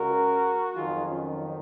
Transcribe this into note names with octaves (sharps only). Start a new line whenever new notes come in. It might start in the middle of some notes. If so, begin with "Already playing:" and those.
Already playing: C#2 C#3 G#3 F#4 A#4
F2 D#3 F#3 F4 G#4
C#4 F4